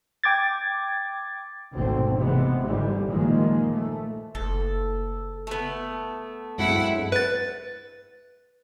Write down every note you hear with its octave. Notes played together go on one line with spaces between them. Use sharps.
G5 D6 G#6 A6
G#1 D2 B2 A3 C4
C3 E3 G#3 B3
G1 G#2 D3 E3 G3
A#2 D#3 F3 G#3 A#3
A3
F#1 A4
A3 B3
G2 F#3 G#3 C4 E4 F#5
B4 A6